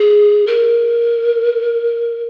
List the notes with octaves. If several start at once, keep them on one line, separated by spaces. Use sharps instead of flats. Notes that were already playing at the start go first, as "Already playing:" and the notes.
Already playing: G#4
A#4